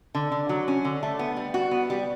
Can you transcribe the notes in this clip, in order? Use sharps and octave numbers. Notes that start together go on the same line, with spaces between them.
D3
D3
F#3
C#4
D3
A3
B3
G3
F#4
B3
G3